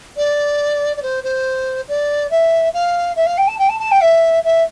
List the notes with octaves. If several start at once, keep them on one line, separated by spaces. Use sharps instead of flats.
D5
D5
C5
C5
D5
E5
F5
E5
F5
G5
A5
G5
A5
A5
G5
E5
E5